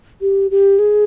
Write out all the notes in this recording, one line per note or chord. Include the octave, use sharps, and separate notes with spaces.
G4
G4
G#4